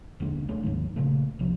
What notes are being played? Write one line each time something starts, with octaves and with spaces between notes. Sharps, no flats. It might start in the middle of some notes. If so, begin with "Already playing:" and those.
E1 D#2 D3 G#3
D2 G#3 A3 C#4
D#2 G#2 D#3
A#2 C#3 A3
E1 C2 C3 F3